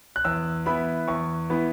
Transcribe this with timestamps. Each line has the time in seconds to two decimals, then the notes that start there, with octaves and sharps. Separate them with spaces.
0.16 F#6
0.25 E2 E6
0.66 E3 B3 E4 B5
1.08 E2 C#6
1.50 E3 B3 E4